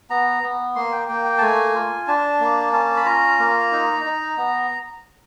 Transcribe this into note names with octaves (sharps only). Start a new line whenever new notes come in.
B3 A#5
B3
A#3 C6
G5
A#3 G5
G5
A5
A3 G#5
F4
D4 A5
A#3
C#4 A5
B5
F4 A#5
A#3
D#4
D#4
B3